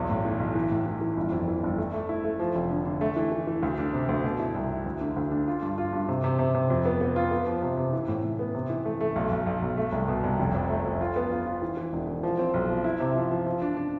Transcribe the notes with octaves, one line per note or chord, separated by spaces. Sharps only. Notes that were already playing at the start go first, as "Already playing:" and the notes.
Already playing: B1 E2
A2
E3
B1
E3
A2
E3
E3
G1
F2
E3
G1
A3
A3
E4
A3
F3
F1
D3
D3
A3
E3
E3
E3
D2
D4
C3
D2
B2
E4
C2
E4
D2
D3
D2
D4
F4
G2
F4
G2
C3
C3
C3
C3
F2
B3
B3
F4
B3
F3
C3
C3
E3
A2
A2
B3
C3
E3
A3
A3
B1
B1
B1
B1
A3
C2
B2
C2
F1
F2
A3
F2
F4
B3
F4
F4
E3
E3
E1
E3
F3
C4
B1
F3
E4
C3
F3
F3
F3
D4
D4